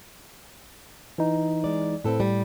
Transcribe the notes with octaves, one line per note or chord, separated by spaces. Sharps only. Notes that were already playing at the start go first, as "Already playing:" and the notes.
E3 D#4
G#3 D5
A2 C4 A4 B4
G3